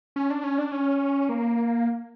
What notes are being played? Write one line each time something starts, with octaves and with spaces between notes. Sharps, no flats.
C#4
D4
C#4
D4
C#4
A#3